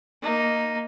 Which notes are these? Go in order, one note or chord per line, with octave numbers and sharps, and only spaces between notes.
A#3 D#4